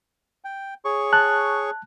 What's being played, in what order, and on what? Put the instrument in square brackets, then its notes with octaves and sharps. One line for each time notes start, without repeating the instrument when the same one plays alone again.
[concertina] G5
G#4 C#5 C#6
[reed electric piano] A5 F#6